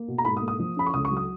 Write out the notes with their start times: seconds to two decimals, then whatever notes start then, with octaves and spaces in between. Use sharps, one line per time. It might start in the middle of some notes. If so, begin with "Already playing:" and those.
Already playing: A#3
0.08 B2
0.18 A#5
0.25 G#2 B5
0.37 D#6
0.42 A#3
0.48 D#6
0.59 F3
0.77 C#4 B5
0.86 C#6
0.94 C#2 D#6
1.05 C#6
1.11 F#3
1.17 D#6